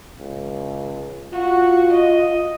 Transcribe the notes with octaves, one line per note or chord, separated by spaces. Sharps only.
C#2
F4 F#4
D#5